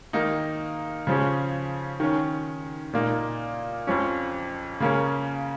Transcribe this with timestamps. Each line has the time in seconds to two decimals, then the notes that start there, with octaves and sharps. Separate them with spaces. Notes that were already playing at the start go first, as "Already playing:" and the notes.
0.13 D#3 A#3 D#4
1.07 C#3 F3 C#4
2.00 D#3 C#4
2.93 A#2 A#3 D#4
3.87 F2 F3 C#4
4.80 C#3 A#3 C#4